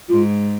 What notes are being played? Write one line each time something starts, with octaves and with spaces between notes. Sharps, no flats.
G#2 F4